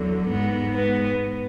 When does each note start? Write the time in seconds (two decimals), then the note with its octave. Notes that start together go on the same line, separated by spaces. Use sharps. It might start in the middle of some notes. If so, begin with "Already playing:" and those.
Already playing: E2 D3 F#3
0.27 G#2 G#3 B3
0.74 B3